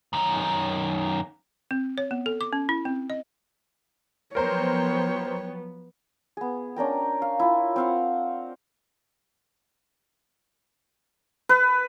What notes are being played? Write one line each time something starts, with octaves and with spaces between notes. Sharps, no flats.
F#2 D#3
C4
C#5
B3
A4
D6
C#4
E4
C4
D#5
F3 F#3 B3 A#4 C5 C#5 G5 A#5
B3 G#4
C#4 D4 A#4 G5
F5
E4 F4
C4 F5 F#5
B4